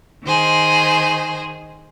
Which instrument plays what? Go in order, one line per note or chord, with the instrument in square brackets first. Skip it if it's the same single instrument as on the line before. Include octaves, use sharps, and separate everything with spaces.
[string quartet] D#3 G#4 C5